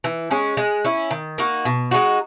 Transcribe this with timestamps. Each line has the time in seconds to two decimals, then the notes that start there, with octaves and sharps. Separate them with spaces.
0.04 E3
0.31 G#3 C#4
0.57 G#3
0.85 C#4 E4
1.11 D#3
1.38 A#3 D#4 F#4
1.65 B2
1.91 G#3 D#4 F#4